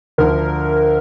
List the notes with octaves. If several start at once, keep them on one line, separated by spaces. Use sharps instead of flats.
D2 D3 F3 A#4